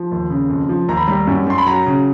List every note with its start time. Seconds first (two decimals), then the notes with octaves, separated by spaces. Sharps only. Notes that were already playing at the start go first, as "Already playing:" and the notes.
Already playing: F3
0.12 D#2
0.30 C#3
0.49 F2
0.69 F3
0.88 D#2 A#5
0.97 B5
1.07 G3 A#5
1.27 F#2
1.47 F#2 C6
1.58 B5
1.66 F#3 A#5
1.86 C#3